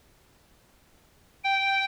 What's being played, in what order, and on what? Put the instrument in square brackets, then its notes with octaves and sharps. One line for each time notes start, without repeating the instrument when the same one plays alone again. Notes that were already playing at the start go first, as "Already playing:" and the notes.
[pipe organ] G5